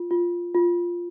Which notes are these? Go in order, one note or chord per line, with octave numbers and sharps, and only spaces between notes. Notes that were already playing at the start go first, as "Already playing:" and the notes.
Already playing: F4
F4
F4